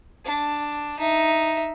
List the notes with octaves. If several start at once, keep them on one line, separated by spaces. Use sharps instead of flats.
D4
D#4 E5